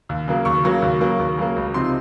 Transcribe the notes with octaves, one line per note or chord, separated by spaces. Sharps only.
D#2
C#3 F#3 A#3
D#2 C#6
C#3 F#3 A#3
D#2
C#3 F#3 A#3
D#2
C#3 F#3 A#3
C#2
C3 F3 C4 D#4 C6